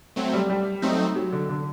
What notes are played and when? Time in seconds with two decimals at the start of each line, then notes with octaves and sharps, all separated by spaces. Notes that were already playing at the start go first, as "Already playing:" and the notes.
0.16 F#3 A3 C4
0.33 G3
0.50 G3
0.82 F#3 A3 C4 D#4
1.15 F#3
1.32 D3
1.49 D3